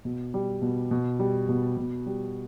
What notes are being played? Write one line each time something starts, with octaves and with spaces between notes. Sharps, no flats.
B2
G3
B2
B2
G3
B2
B2
G3